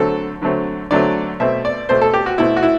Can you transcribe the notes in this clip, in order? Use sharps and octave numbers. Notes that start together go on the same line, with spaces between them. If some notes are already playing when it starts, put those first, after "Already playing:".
Already playing: D3 F#3 A3 C4 A4
D3 F#3 A3 C4
D3 F#3 A3 C4 D5
B2 A3 C4 E5
D5
B2 A3 C4 C5
A4
G4
F#4
B2 A3 C4 E4
F#4
E4